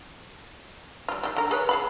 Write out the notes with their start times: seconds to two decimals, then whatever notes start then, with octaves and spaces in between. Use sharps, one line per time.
1.08 G3 F4
1.23 D#3 G3
1.36 D3 A#4
1.51 G#4 B4 C#5
1.69 G#4 F5 B5